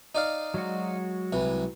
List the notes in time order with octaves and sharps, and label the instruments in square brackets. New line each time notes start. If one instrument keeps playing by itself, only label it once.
[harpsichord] D#4 D5 F5
[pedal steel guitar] F#3 G#3 F#4
[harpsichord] C2 E3